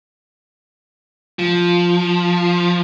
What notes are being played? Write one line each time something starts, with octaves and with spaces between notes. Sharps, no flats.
F3